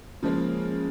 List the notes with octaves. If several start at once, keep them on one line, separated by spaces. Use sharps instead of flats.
C#3 F3 G#3 A#3